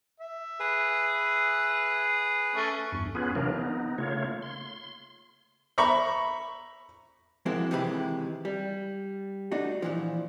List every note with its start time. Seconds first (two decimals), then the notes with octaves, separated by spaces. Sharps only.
0.20 E5
0.60 G#4 B4
2.55 A3 C#4
2.92 E2 G2
3.15 B3 C#4 F4 G#4 B4
3.35 C3 E3 F#3 A#3 D4 A#4
3.54 B3 D#4
3.98 C#3 A3 A#3 F4 C#5
4.42 C6
5.78 E5 A#5 B5 C#6
7.46 F3 G#3 A#3 C4 E4 F#4
7.71 C3 D#3 E3 G#3 G4 B5
8.45 G3
9.52 A3 D4 D#4 F#4
9.82 A#2 E3 F3